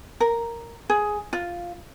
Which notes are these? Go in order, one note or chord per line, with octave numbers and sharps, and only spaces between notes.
A#4
G#4
F4